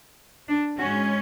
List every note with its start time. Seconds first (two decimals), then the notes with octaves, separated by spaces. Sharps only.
0.49 D4
0.77 G#2 G#3 C#4 F#4